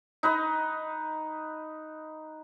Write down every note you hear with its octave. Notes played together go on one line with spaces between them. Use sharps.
D#4 B4 D#5